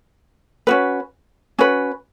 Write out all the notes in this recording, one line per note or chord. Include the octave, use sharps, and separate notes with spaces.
C#4 F#4 B4
C#4 F#4 B4